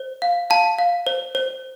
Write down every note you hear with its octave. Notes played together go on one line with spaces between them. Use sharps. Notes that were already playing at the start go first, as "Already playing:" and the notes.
Already playing: C5
F5
F5 A5
F5
C5
C5